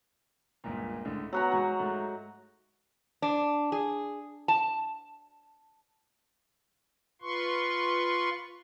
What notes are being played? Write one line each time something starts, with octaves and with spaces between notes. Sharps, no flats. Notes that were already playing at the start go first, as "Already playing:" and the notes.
G1 C#2 A#2
C#2 A2 D3
F#3 B3 F#5 A#5
G#2 F#4 G#5 F#6
G#2 A3
D4
G#4
A5
F4 B4 C6 C#6